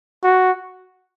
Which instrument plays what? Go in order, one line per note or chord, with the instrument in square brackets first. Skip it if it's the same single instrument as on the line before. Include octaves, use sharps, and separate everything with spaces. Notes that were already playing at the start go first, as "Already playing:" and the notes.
[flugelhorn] F#4